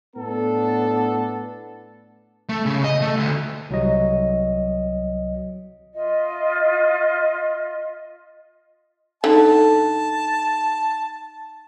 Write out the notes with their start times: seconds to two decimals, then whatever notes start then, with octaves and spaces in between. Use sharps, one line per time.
0.16 A2 B3 D4 A4
2.49 A3
2.66 C#3
2.84 D#5
3.01 A3
3.16 D2
3.70 C2 F#3 D#5
5.93 F4 D#5 E5
9.24 D3 D#4 A4 A5